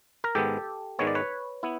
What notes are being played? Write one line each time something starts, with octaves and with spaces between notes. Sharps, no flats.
A#4
G#2 D#3 G#3 B3 G4 A4
G#2 D#3 G#3 B3 C#5
D5
B4 C#5
B3 E4